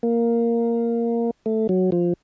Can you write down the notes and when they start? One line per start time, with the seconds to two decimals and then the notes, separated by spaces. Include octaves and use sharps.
0.03 A#3
1.46 A3
1.69 F#3
1.92 F3